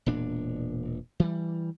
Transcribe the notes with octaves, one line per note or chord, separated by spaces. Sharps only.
E1 A#2 D4
E3 G3